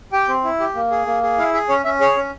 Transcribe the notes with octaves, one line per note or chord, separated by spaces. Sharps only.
G4 G5
C4
E4
G4
A#3
G#4
A#3
G#4
E4 F5
G#4 E5
C#4 C#5
C#4 E5
G#4 C#5
C#4